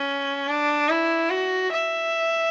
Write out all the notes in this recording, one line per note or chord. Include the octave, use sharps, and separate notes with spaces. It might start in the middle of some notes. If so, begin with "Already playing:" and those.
Already playing: C#4
D4
E4
F#4
E5